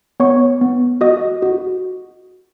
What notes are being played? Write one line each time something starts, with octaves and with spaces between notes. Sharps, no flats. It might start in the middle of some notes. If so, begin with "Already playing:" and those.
B3 C#5 C#6
B3
F#4 D#5 D#6
F#4